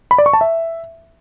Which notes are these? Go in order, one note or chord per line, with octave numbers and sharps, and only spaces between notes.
B5
D5
C#6
A5
E5